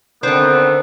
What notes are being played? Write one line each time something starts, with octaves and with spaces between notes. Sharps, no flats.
D3 D#3 A3 B3 C4